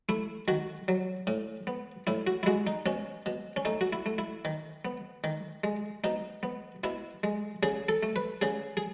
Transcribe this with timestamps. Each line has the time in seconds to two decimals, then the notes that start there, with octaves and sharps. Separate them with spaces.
0.09 A3 E4
0.48 D#3 F#4
0.88 F#3
1.27 A2
1.67 B3
2.07 A2 E4
2.27 F#4
2.43 E4
2.46 G#3 F#4
2.67 D#4
2.86 B2 C#4
3.26 B2
3.56 C#4
3.65 A3 D#4
3.81 F#4
3.93 E4
4.06 A3
4.18 E4
4.45 D#3
4.85 B3
5.24 D#3
5.64 G#3
6.04 B2 D#4
6.43 B3
6.84 B2 E4
7.23 G#3
7.63 C#3 G#4
7.89 A4
8.03 A3
8.16 B4
8.42 C#3 G#4
8.77 G#4